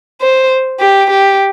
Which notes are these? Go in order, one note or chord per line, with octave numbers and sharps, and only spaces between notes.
C5
G4
G4